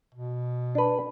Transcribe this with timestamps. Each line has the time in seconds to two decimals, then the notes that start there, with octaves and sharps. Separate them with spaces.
0.15 B2
0.75 D4 B4